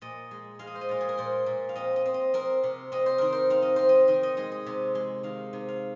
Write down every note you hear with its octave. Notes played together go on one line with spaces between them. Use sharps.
A#2 D#5
G#3
G#3 F5
D#5
C5
D#5
A#2 F4
G#4
A#4
A#2 C5
A#2
F5
C4 D#5
D#5
C4
D#5
C4 A#4
C3
C4 D#5
C5
D#3 A#4
C5
C4 F5
D#5
C4 C5
D#5
D#3 D#5
D#5
G#3 D#5
D#5
C3
G#3
D#3 F5
C3
F5